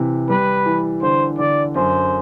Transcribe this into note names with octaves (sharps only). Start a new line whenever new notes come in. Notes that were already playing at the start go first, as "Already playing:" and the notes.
Already playing: C3 E3
G3 B4
E3
D3 C5
D3 D5
F#2 C5